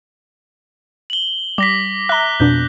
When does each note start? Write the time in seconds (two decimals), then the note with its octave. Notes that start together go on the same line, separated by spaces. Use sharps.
1.10 F#7 G7
1.58 G3 D6 A#6 B6
2.09 E5 A#5 F#6 G7
2.40 F2 B2 D4 G6